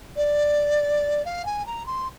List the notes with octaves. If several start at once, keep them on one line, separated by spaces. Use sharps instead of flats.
D5
F5
G#5
A#5
C6